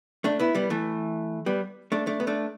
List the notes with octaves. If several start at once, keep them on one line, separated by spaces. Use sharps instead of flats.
A3 D4
B3 E4
G3 B3
E3 A3
G3 B3
A3 D4
A3 D4
B3
A3 D4